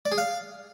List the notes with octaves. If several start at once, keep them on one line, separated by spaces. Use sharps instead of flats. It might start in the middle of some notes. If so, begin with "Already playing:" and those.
D5
G#4
F5